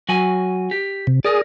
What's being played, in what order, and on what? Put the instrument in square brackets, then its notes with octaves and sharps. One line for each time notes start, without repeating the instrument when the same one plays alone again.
[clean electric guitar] F#3 F#4 G#5
G4
[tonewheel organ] C3
[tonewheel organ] G#4 D#6 [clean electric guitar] A#4 D5